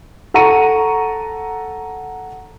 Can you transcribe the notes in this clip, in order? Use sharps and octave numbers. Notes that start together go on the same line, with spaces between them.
A4 F#5 A#5 C#6 C#7 D#7